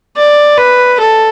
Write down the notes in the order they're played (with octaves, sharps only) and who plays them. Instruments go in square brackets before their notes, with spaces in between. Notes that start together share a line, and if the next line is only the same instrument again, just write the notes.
[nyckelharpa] D5
B4
A4